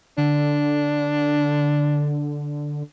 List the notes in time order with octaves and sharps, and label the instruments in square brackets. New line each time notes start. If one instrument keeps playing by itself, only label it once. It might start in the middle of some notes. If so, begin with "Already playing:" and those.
[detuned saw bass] D3 [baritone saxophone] D4